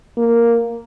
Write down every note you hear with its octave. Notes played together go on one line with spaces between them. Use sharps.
A#3